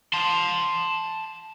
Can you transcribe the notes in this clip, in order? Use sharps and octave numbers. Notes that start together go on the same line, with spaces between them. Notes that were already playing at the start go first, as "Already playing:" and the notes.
A5 C6